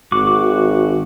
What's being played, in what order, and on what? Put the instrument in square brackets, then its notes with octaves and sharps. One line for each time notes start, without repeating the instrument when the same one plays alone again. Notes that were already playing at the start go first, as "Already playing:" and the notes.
[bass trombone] G#1 [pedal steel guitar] F#4 D6